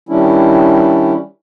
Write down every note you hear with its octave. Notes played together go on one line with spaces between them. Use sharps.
D#3 G3 C#4 D4 E4